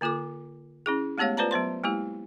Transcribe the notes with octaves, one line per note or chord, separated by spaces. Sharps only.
D3 A#3 F4 A4 D6
C#4 E4 G#4
G#3 A3 B3 G4 C#5 F5
F4 B4 C5 D5 A5 A#5
F#3 B3 C5 C6
G#3 A#3 E4 G4